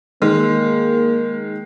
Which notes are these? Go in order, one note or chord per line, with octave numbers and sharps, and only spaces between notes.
D#3 G#3 A#3